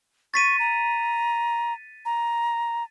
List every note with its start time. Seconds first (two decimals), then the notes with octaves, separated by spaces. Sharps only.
0.34 C#6 A6 B6 D#7
0.59 A#5
2.05 A#5